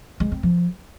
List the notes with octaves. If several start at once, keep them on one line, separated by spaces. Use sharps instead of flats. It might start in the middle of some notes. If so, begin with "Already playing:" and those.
G#3
C4
F3